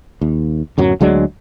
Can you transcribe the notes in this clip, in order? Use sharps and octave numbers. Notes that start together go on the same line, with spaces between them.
D#2
D1 F#2 F#3
D2 F#3 G#3 D4